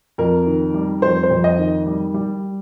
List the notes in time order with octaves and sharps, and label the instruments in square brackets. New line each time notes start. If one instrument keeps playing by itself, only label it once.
[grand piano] F2 A#4
D#3
G3
F2 C5
C5
F2
D#5
D#3
G3
G3